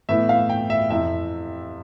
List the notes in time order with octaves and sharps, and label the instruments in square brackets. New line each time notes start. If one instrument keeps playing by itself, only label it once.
[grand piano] A2 E3 B3 E5
F5
G5
E5
F2 C3 E3 E5